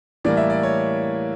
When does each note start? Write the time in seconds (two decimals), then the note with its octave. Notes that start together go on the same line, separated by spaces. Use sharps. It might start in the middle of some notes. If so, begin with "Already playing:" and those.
0.24 A2 E3 G3 A#3 D5
0.37 E5
0.50 D5
0.63 C#5